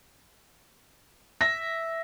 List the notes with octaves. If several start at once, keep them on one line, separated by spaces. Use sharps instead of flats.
E5 A#6